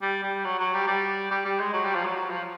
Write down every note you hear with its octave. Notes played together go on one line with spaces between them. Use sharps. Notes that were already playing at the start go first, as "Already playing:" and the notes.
G3
G3
F#3
F#3
G3
G3
G3
G3
G#3
F#3
G3
F3
F#3
F#3
F3